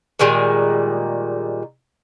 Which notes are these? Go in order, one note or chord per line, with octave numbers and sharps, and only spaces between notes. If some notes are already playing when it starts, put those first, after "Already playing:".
A#2 D#3 G3 G#3